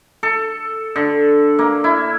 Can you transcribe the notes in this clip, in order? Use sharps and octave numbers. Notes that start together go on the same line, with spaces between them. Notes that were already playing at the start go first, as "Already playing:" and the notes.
A4
D3
A#3
E4